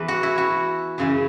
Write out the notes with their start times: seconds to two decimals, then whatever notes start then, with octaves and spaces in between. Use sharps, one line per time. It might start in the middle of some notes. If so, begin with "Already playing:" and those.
Already playing: E2 E3 B4
0.08 F#4
0.23 E4
0.38 F#4
0.98 F#2 C#3 E3